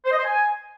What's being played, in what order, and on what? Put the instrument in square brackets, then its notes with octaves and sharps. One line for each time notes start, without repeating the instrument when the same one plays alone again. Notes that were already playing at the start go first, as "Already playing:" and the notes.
[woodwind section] C5
D#5
C5
G#5